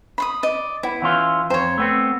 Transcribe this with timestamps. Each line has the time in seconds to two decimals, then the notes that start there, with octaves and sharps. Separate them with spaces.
0.18 B5 C6 D#6
0.43 D5 D#5
0.83 B3 E4
1.02 E3 C#4 F4
1.50 F2 C5 C#5
1.78 A3 B3 C4